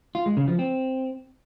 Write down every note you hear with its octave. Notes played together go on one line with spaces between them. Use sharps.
F4
G#3
C#3
F3
C4